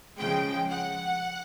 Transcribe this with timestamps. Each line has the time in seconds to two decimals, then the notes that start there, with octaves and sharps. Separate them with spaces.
0.19 C#3 F3 G#3 G5
0.70 F#5